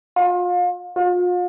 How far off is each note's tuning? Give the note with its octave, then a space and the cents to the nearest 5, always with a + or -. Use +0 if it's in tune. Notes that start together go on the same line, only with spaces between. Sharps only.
F4 +35
F4 +40